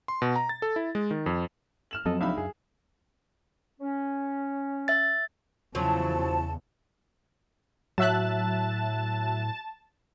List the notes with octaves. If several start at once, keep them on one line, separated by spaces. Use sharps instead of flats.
C6
B2
A#5
A6
A4
E4
G#3
D#3
F2
F6 E7 F#7
F2 F3 F#3 C4 A4 D#5
C#2 D4 D#4 E5 F5 B5
F#2 G#4
C#4
E5 A6
E2 C#3 F3 F#3 E4 A5
A2 F#3 E5 A5 F#6